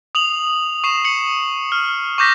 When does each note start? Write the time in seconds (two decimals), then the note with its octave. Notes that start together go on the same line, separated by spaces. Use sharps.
0.15 D#6 F7 F#7
0.84 C#6 C7 E7
1.05 C#7 F#7
1.72 F6
2.18 C#6 D6 G6 A#6 B6